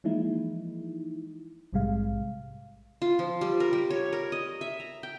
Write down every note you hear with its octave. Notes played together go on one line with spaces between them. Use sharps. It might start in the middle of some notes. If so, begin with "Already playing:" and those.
E3 F3 G#3 A#3 D#4 E4
A#1 G#2 C3 G3 G#3 F5
F4
F3
G3
A#4
G3
C#5
A#4
D#5
E5
A#5
G5